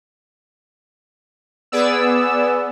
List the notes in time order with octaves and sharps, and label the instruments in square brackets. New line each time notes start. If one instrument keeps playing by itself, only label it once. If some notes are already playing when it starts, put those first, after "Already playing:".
[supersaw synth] B3 [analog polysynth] G#4 D5 E6